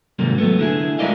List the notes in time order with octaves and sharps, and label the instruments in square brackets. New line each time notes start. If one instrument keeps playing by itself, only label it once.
[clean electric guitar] D#2 G#2 C3 G3 G#3 A#3
F#3 A3 B3
D3 E4 G#4
G#3 E4 A#4 D5 D#5 F5